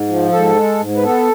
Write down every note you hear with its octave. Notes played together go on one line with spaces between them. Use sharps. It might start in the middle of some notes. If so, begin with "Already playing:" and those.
Already playing: G#2
F3
G#2 A4
G#3
G#2
B4
B3 A4